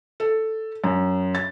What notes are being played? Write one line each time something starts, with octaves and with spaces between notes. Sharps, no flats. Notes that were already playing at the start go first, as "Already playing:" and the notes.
A4
F#2
A6